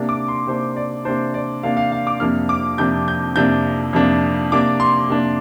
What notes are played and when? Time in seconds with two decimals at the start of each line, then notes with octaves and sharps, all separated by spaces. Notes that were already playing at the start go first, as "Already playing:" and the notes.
Already playing: C3 A#3 D4
0.09 D6
0.28 C6
0.47 C3 A#3 D4 C5
0.76 D5
1.05 C3 A#3 D4 C5
1.34 D5
1.63 C3 A#3 D4 F5
1.77 F5
1.92 F5
2.07 D6
2.20 F2 C3 A#3 D4 F6
2.49 D6
2.78 F2 C3 A#3 D4 G6
3.08 G6
3.36 F2 C3 A#3 D4 G6
3.93 F2 C3 A#3 D4
4.52 C3 A#3 D4 D6
4.80 C6
5.09 C3 A#3 D4